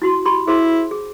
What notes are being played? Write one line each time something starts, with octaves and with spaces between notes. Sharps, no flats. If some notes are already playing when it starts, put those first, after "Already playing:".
E4 F#4 C6
G4 B5 C6
E4 G#4 C5 C6
G#4